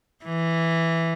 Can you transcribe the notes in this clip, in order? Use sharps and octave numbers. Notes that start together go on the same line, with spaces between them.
E3